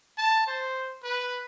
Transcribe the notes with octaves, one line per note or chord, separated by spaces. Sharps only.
A5
C5
B4